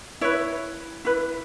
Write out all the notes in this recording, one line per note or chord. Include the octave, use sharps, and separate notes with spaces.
E4 B4 C#5
E4 B4